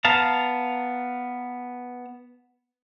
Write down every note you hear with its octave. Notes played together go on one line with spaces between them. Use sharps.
B3 F5 A5 A#5